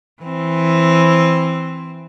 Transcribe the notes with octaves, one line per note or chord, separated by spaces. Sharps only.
E3 C4